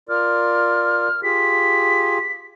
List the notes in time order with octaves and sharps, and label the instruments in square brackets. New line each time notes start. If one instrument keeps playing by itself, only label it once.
[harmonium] F4 A#4 D5 [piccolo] F6
[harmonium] F4 G4 G#4 [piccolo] B6